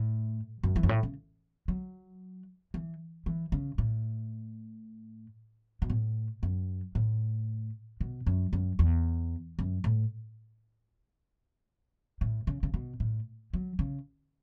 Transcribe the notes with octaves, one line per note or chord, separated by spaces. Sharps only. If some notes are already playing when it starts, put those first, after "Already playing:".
Already playing: A2
F#2
E3
F#2
A2
C#3
F#3
E3
E3
C#3
A2
B2
A2
F#2
A2
B2
F#2
F#2
E2
F#2
A2
A2
C#3
C#3
B2
A2
F#3
C#3